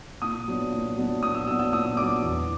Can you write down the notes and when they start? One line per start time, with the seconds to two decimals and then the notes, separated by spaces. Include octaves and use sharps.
0.22 A#2 D#6
0.48 F#3 B3 D4
0.72 A#2
0.98 F#3 B3 D4
1.23 A#2 D#6
1.35 E6
1.47 F#3 B3 D4 E6
1.59 E6
1.73 A#2 D#6
1.97 F#3 B3 D4 D6
2.22 E2